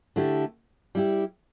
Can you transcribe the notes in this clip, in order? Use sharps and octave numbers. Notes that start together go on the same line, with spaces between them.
D3 A3 E4 G4
G3 E4 G4